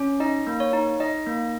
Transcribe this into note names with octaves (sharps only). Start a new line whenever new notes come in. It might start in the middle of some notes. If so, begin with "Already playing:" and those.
Already playing: C#4
D#4 D#5
A#3
C#5
D#4
D#4 D#5
A#3